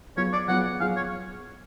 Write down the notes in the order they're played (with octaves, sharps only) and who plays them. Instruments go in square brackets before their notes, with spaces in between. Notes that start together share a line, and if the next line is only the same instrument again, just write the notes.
[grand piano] F#3 B3 F4 G#4 [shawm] C#5
[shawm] D5
[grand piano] F#3 B3 F4 G#4 [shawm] F#5
[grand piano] F#3 B3 F4 G#4 [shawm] F5
[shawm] C#5